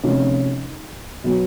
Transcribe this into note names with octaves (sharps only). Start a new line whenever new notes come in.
C3 F3 A3 C#4 D#4
B2 F#3 B3